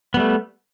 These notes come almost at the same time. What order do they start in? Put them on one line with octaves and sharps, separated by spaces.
B3 G3 A3